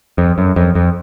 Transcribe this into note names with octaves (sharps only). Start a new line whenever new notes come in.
F2
F#2
F2
F2